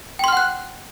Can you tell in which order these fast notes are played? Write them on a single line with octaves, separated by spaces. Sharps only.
G5 C6 F6 F#5 F#6